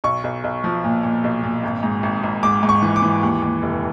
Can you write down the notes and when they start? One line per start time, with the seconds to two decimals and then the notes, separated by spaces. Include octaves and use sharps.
0.04 B1 C#6
0.24 B1
0.44 B1
0.64 F3
0.84 A#2
1.03 A#2
1.24 B1
1.43 A#2
1.63 G#1
1.83 G#2
2.03 G#1
2.23 G#1
2.43 G#2 D6
2.63 G#2
2.69 C#6
2.82 E3
2.96 D6
3.02 E3
3.23 D#2
3.42 D#2
3.62 F1